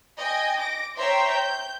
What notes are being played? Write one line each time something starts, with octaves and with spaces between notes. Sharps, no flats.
D#5 G5 G#5
D6 A#6 D7
C5 C#5 E5 G5 A#5 C6
G6